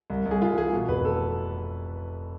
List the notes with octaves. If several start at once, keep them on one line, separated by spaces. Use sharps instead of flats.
C2
C2
G#4
C2 F4
E3 G#4
B2
F1 B4
A4